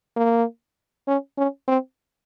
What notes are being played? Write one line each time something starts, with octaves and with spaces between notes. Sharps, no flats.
A#3
C#4
C#4
C4